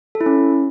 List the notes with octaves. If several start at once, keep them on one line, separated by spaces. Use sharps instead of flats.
A4
E4
C#4